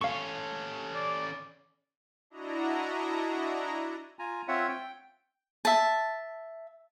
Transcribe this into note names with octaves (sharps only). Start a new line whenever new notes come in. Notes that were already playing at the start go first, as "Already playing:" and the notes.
C#4 A4 F5 C#6
D5
D4 E4 F#4 D#5 A#5
F4 G#5 A#5
C4 F4 C#5 E5 F#5
G5
E5 A5